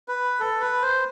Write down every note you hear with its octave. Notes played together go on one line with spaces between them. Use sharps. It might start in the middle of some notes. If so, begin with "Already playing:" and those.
B4
A4
B4
C5